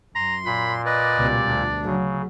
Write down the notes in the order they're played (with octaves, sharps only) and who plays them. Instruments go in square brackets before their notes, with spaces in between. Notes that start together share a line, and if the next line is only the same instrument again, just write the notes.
[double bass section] F#2 [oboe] A#5 [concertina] C6
[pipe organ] A#2 [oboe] B5
[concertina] B4 D#5 [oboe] D5
[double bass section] C#2 B2 G3
[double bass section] D2 [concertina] D4
[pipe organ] C#3 [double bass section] F#3